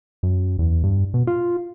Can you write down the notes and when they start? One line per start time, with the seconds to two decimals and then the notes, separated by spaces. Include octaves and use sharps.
0.23 F#2
0.59 E2
0.83 G2
1.14 B2
1.27 F4